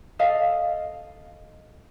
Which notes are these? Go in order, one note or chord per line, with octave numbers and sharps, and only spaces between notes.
A4 D#5 F5